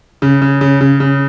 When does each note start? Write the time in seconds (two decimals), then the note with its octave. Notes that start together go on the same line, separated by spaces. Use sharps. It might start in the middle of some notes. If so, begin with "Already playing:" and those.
0.22 C#3
0.42 C#3
0.61 C#3
0.81 C#3
1.00 C#3